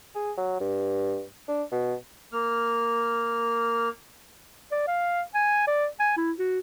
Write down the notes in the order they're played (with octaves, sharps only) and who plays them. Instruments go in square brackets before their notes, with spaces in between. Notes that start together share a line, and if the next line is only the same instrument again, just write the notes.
[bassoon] G#4
F#3
G2
D4
B2
[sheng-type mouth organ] A#3 F6
[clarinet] D5
F5
G#5
D5
G#5
E4
F#4